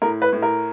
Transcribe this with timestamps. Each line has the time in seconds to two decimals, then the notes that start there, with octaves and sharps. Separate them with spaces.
0.02 A2 A#4
0.22 B4
0.33 A2
0.42 A#4